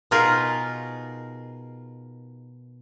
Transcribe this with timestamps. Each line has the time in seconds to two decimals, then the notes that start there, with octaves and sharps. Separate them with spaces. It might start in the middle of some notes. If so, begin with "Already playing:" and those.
0.11 B2 D#4 F4 G#4 A#4